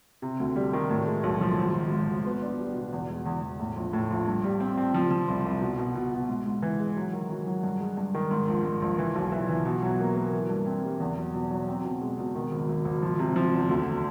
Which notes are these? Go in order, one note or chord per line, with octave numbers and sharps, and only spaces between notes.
C3
D2
G3
D#3
A2
G#3
B1
F3
G#1
G#1
G#2
G#1
B3
D4
G3
B2
E2
G#3
E2
E2
A2
A#1
A2
A#1
G2
G3
C4
C4
F3
F3
C2
C2
B2
B2
B2
B2
G#2
G#2
E3
G#3
F#3
D#3
F#3
F#3
G2
G#3
G2
D#3
G#2
A#1
G#2
A#1
E3
B1
E3
E3
B2
F#3
A#3
A#3
E3
G2
C4
G3
E2
F#3
B2
F#3
C4
B2
G#3
B2
D#3
G#1
G#1
G#1
F3
C3
F3
E2
D2